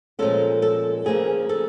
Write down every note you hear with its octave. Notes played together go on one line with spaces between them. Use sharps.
A#2 F3 G#3 C#4 F4 A4
A4
D2 C#3 F3 A#3 G#4
A4